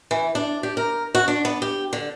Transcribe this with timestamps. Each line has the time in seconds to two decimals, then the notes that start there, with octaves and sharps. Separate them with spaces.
0.11 E3
0.35 D4
0.63 G4
0.77 A#4
1.15 F#4
1.28 D4
1.45 B3
1.62 G4
1.93 D3